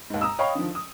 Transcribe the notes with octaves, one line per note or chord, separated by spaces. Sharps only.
D#2 G#2
A#5 D#6 E6
C#5 D#5 F5 G5 B5 C#6
D3 D#3 F3
D#6